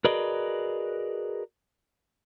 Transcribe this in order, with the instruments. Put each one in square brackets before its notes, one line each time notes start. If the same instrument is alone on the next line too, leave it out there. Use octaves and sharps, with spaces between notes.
[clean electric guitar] F#4 G#4 A#4 B4 D5 D#5